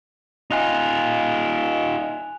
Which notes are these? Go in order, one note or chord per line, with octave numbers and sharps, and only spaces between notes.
D#4 F4 G#5 F#6 F7